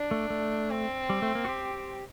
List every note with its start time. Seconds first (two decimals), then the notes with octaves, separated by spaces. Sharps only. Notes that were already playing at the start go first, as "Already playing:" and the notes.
Already playing: D4
0.11 A3
0.30 A3
0.70 C4
1.10 G3
1.22 A3
1.35 A#3
1.45 F#4
1.49 G4